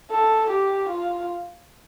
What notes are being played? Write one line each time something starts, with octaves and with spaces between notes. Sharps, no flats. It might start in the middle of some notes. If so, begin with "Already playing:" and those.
A4
G4
F4